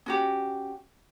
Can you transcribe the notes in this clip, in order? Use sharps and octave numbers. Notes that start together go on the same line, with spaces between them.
C#4 F#4 G4